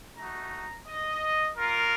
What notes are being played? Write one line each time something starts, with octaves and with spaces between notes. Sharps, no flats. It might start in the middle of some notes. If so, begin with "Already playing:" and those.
A3 D#4 F#4 A#5
D#5
A#3 F4 A#4